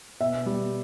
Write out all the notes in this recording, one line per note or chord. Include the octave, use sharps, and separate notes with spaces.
B2 E5
G3